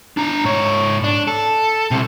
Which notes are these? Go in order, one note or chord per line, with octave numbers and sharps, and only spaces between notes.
D4 A#5
G#2 C#5
D4
A4
C2 C3